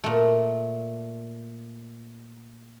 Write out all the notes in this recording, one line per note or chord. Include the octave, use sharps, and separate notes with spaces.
A#2 A3